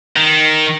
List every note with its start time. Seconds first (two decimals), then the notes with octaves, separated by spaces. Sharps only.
0.17 D#3